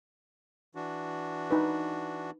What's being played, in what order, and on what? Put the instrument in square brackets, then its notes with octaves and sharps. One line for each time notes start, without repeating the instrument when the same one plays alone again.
[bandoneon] E3 D4 F#4
[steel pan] D#4 B4